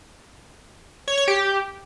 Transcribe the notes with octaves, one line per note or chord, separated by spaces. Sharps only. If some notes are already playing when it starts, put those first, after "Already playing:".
C#5
C#5
G4